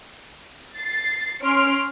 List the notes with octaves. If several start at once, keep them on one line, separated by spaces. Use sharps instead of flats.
A6 C7
C#4 C6 F6 D7